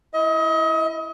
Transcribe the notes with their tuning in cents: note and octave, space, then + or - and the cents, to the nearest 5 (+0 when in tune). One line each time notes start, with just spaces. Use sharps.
E4 +0 D#5 +35